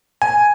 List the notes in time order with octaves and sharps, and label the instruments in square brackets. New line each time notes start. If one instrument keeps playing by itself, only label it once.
[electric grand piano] G#5